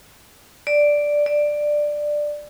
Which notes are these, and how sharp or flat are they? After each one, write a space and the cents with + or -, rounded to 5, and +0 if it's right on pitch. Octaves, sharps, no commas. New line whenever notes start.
D5 +0
D5 +10